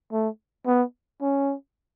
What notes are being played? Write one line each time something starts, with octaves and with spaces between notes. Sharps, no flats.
A3
B3
C#4